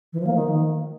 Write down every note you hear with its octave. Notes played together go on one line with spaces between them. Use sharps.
E3
F3
A#3
D#3